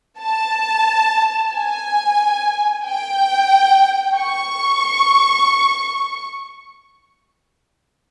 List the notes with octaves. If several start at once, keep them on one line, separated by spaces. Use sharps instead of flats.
A5
G#5
G5
C#6